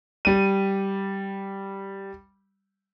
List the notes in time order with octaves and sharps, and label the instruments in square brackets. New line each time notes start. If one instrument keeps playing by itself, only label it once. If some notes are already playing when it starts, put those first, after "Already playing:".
[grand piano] G3 D#7